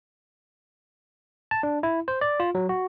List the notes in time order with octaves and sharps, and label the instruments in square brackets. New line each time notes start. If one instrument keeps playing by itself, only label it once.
[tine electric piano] A5
D4
E4
C5
D5
F4
F#3
F#4